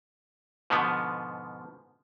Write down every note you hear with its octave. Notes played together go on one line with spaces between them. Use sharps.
G#2 B2 D3 F3 B3